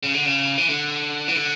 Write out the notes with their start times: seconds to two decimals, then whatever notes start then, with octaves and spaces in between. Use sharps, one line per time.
0.03 C#3
0.14 D3
0.26 C#3
0.58 E3
0.69 D3
1.28 E3
1.35 D3